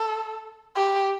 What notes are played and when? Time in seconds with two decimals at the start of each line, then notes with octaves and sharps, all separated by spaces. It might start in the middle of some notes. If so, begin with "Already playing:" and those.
Already playing: A4
0.76 G4